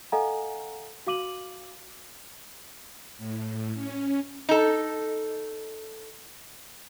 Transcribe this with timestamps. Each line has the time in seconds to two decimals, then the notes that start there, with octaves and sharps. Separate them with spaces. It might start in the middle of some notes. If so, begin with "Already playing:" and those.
0.12 A4 D#5 F5 F#5 G#5 A#5
1.07 F#4 F5 D6 D#7 F#7
3.18 A2
3.74 C#4
4.49 D#4 A4